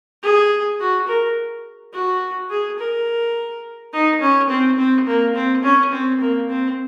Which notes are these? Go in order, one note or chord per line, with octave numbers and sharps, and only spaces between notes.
G#4
F#4
A#4
F#4
G#4
A#4
D#4
C#4
C4
C4
A#3
C4
C#4
C4
A#3
C4